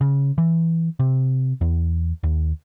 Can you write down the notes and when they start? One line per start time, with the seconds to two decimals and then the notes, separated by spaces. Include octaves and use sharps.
0.01 C#3
0.38 E3
1.00 C3
1.61 E2
2.23 D#2